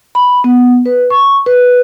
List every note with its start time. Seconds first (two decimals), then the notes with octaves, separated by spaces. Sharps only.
0.15 B5
0.44 B3
0.86 B4
1.10 C#6
1.46 B4